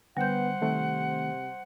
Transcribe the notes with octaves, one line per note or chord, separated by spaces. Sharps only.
D3 G3 B3 C5 F#5 G6
C3 D#3 A3 C4